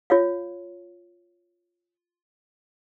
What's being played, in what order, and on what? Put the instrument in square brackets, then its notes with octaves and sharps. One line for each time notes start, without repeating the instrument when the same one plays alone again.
[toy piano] F4 C#5 F5